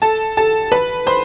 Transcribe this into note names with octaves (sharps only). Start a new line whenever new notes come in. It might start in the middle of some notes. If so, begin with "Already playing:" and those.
A4 A5
A4 A5
B4 B5
C5 C6